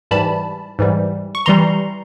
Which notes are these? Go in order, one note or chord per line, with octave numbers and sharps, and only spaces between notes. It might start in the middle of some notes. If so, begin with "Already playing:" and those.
G#2 E3 G3 A5 B5
G#2 E3 G3
C#6
E3 G3 A#5 C6